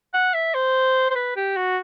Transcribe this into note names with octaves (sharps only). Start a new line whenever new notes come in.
F#5
E5
C5
C5
B4
G4
F#4